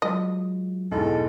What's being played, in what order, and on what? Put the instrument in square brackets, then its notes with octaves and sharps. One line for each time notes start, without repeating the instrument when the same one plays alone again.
[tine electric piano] F#3 G#3 F4 [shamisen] D#5
[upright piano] B1 E2 G#2 [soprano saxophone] A4